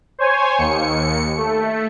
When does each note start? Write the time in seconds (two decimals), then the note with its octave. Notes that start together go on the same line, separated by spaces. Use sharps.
0.19 C5 C#5 G#5
0.58 D#2 C#7
1.37 A3